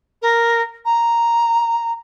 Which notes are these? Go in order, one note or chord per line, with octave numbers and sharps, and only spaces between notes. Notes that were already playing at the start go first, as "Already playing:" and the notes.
A#4
A#5